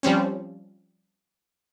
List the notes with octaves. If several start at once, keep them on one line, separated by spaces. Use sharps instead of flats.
F3 G3 C4 C#4